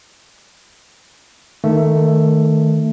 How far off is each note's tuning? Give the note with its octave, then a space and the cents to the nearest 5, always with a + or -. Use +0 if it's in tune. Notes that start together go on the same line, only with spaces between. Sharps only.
D#3 +0 A3 +10